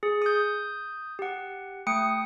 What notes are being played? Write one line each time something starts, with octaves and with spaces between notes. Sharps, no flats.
G#4
D#6 G6
G4 F#5
A3 G5 D#6 C#7